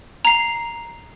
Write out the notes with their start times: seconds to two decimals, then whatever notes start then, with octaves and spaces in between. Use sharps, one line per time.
0.25 A#5 C7